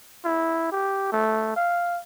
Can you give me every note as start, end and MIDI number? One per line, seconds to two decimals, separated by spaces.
0.25 0.69 64
0.72 1.09 67
1.12 1.52 57
1.56 2.00 77